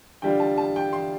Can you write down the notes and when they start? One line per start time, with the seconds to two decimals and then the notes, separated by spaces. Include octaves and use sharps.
0.22 D3 G3 F4 G5
0.40 A5
0.58 A5
0.76 G5
0.93 C6